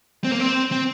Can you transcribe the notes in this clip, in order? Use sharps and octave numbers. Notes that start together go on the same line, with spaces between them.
C4
A#3
C4
C4